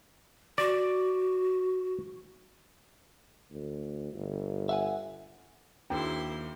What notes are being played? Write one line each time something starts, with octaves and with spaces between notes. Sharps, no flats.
F#4 D5
D2
G1
E5 F#5 G#5
D#2 D4 E4 F#4 G#4 G5 C6